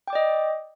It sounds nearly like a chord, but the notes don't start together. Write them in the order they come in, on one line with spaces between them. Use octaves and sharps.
G5 D6 D5 D#5